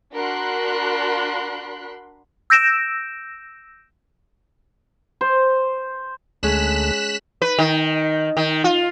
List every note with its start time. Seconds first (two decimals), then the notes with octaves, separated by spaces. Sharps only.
0.14 D4 F#4 A#4 B5 C6 F#6
2.50 E6 G6 A#6 D7 E7
5.21 C5
6.43 D2 G#3 A3 C#4 G#4 F#6 B6 E7
7.42 B4
7.59 D#3
8.37 D#3
8.64 F4